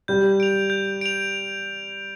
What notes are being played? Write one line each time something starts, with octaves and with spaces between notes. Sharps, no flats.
G3 G6
D7 F7
G6
D7 F7